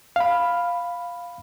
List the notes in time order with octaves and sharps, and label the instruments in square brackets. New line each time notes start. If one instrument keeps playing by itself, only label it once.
[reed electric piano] F5 B5